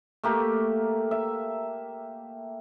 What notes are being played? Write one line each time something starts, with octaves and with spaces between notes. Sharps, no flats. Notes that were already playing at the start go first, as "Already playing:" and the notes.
A3 A#3 G4
E5